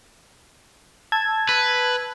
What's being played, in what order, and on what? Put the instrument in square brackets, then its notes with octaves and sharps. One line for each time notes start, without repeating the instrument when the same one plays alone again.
[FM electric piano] A5 E6 G#6
[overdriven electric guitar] B4